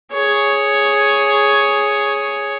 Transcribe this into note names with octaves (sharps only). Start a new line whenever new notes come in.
G#4 C#5